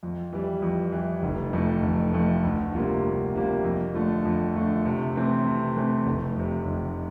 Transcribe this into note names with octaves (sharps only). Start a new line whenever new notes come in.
F2
E3 G3
F2
E3
G3
F1
F2 E3 A3
F1
F2 E3 A3
D2
C3 G3 A#3 F4
D2
C3 G3 A#3 F4
F2
D3 F3 A3
F2
D3 F3 A3
C3
E3 A3 C4
C3
E3 A3 C4
F1
F2 C3
F1